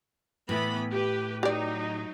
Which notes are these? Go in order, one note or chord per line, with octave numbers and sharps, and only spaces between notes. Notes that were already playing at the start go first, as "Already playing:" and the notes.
A2 E3 B3 B5
G4 B4
F#3 D#4 G4 D5